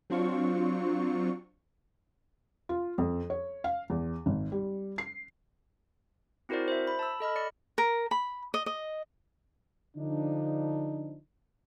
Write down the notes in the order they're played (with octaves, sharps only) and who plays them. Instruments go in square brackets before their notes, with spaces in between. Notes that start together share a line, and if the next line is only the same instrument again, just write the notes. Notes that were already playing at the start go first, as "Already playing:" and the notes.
[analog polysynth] F#3 C4 D4 F4 C#6
[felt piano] F4
F2
C#5
F5
E2
G#1
G3
C7
[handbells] C4 E4 F#4 A#4 C5 D5
C5 E5
B5
A5 E6
A4 D#5 B5 F6
D5 C#7
[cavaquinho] A#4
B5
D#5
D#5
[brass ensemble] D3 F3 D4 D#4